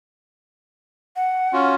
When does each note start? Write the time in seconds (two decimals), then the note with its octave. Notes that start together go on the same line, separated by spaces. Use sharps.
1.16 F#5
1.53 C#4 F4 F#4